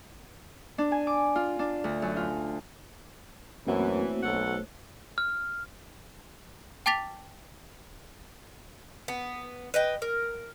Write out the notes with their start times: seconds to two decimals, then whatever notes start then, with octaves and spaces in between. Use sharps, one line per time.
0.78 D4
0.92 G#5
1.07 D6
1.36 F4
1.59 D4
1.84 D2
2.02 F#2
2.17 F4
3.67 F#2 E3 A3 A#3 C4 F#4 C5 C#5
4.23 B1 F#3 A4 F#5
5.18 F6
6.86 G5 A5 D6 A6 B6 F7
9.08 B3
9.74 B4 D#5 G5
10.02 A#4